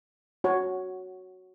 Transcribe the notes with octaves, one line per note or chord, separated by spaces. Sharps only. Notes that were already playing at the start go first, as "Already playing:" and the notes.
F#4 C#5